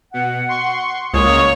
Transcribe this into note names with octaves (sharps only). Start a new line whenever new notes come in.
B2 F#5
C6 C#6
C#2 C#3 G#3 A#3 F4 C#5 F5 D#6